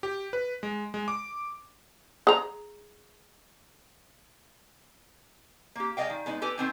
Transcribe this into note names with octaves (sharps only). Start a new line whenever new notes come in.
G4
B4
G#3
G#3
D6
G#4 A#5
A#3 G4
G#3 D5 D#5 F5 G5
D#3
G#3 B3 D#4
G4 A4 B4 G#5
D#3 F#3 B3 C4 C5 G#5